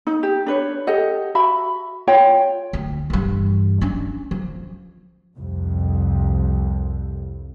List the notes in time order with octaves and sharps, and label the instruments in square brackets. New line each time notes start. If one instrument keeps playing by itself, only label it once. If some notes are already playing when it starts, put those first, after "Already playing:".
[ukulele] D#4
G4
D4 B4 C#5
G4 A4 D#5 F#5
F#4 E5 B5
F4 C#5 G5
[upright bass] D2
G2 E3
C#4 D4
F3
[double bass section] C2 F2